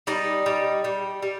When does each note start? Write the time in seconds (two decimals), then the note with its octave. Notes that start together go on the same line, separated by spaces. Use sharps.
0.07 G3 D#4
0.46 G3
0.84 G3
1.23 G3